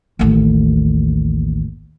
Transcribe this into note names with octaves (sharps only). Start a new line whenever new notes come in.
A1 D#2